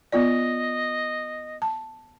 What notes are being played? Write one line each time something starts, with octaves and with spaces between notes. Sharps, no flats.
B3 F4 D5 D#5
A5